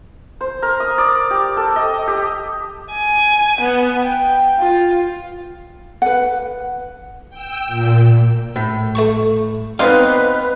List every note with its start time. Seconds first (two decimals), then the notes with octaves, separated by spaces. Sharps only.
0.41 C5
0.62 A#4
0.80 D#6
0.98 D5
1.30 G4
1.57 A4
1.76 D#5
2.07 G4
2.91 G#5
3.61 B3
4.03 G5
4.58 F4
6.02 B4 F#5
7.30 G5 E6
7.67 A#2
8.56 A2
8.95 A3 A5 C#6
9.79 B3 C4 D#4 B4 C5 D5 F5 G5